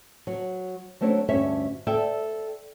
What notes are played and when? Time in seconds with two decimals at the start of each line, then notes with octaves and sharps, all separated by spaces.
0.27 F#3
1.01 F#3 A3 C4 D4 C#5
1.29 D2 G2 C#4 C#5 E5
1.87 A4 D5 E5 G5